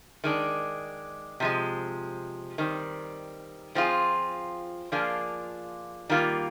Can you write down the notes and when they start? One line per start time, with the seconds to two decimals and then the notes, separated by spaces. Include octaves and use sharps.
0.24 D#3 G#3 D4
1.40 C3 F3 G#3
2.58 D#3 G3 C4
3.75 F3 C4 F4 G#4
4.92 F3 A#3 D4 F4 G#4
6.09 D#3 G3 A#3 F4